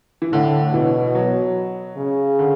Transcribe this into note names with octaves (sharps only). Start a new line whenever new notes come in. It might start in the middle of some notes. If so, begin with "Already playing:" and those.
E3
A2 D3
B2 E3
F#3
C#3
D3